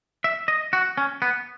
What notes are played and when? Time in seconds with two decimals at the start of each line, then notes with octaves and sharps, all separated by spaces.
0.24 E5
0.48 D#5
0.73 F#4
0.97 C#4
1.22 B3